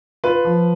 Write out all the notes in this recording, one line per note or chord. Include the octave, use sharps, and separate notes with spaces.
F4 B4
F3